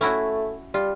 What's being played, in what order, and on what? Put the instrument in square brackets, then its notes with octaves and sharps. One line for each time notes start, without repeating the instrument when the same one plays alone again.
[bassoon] A3 [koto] C#4 E4 F#4
[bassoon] G3 [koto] F4